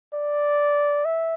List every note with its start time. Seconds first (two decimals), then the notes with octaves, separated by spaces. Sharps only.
0.13 D5
1.05 E5